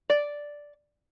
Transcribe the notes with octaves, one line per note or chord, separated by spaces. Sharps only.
D5